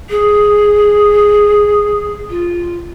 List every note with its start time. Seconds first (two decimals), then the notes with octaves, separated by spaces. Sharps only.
0.10 G#4
2.29 F4